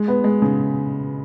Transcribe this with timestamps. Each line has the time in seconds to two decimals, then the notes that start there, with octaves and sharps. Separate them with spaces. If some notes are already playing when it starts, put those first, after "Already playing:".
Already playing: G#3
0.08 B3
0.24 G#3
0.42 C#3